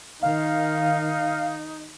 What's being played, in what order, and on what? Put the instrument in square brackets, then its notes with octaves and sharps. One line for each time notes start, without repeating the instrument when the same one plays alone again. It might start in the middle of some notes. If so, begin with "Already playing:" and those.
[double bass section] D#3 [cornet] D#4 [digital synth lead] F5